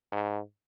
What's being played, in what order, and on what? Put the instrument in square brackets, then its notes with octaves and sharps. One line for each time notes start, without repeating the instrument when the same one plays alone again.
[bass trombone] G#2